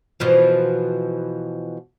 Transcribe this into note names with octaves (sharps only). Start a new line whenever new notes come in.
B2 E3 F3